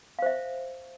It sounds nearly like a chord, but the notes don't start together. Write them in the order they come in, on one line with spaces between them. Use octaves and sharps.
F5 C5 E5